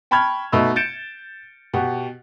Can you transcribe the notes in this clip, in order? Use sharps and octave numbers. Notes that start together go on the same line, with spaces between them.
G5 A5 B5 C#6 F6 G#6
B2 A3 D#4 B5 E6
G6 A6 C#7 D7 E7
B2 G4 F#5